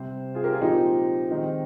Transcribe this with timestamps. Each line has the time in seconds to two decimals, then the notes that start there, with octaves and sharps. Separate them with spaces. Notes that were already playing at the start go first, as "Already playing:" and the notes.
Already playing: C3 G3 C4 C5
0.34 F4 G#4
0.43 G4 A#4
0.53 F4 G#4
0.61 A#2 F3 G#3 C4 D#4 G4
1.31 D#3 G#3 C4